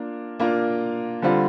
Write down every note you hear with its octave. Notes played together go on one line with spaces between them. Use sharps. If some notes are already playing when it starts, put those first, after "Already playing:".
Already playing: A#3 D4 F4 A#4
A#3 D4 F4 A#4
D3 G3 C4 F4